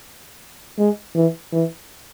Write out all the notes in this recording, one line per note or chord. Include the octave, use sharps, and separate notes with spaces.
G#3
E3
E3